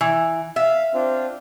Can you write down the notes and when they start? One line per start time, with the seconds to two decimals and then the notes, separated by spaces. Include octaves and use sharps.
0.01 E3
0.56 E5 F5
0.94 C4 D4 F4